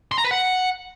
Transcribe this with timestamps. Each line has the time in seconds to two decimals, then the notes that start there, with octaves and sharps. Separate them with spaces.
0.12 C6
0.18 A#5
0.25 B4
0.31 F#5